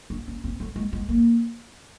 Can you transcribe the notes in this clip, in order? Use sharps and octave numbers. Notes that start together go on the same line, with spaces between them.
D4
C#4
C4
A3
G#3
G#3
A#3